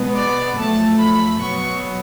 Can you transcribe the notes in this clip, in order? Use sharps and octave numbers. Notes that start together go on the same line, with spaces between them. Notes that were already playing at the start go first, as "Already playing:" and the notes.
Already playing: B2 G#3 B3
D5
F#2 F3 A3 A5
B5
B2 F#3 B3 C#6